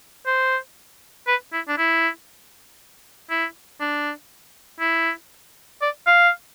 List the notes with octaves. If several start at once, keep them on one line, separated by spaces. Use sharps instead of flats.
C5
B4
E4
D4
E4
E4
D4
E4
D5
F5